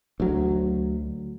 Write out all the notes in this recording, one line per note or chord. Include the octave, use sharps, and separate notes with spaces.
D2 F#3